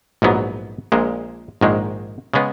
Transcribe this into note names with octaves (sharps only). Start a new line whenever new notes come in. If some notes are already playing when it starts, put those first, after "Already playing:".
A#1 G#2 F#3 B3
A#1 A#2 G#3
A#1 G#2 D#3 G#3
C#3 G#3 B3